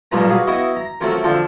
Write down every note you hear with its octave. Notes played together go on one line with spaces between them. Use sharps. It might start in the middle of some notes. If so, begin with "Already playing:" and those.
B1 G2 A#2 F4 B4 A#5
F#4 G#4 B4 F5
B3 E4 F#4 D#5
A#5
F#3 A3 C4 C#4 F4 A#4
D3 F3 C4 F4 A4 A5